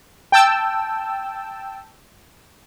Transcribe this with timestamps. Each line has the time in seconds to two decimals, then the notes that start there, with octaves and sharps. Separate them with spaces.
0.32 G5 A5 E6